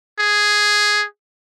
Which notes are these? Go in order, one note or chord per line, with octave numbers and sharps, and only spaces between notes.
G#4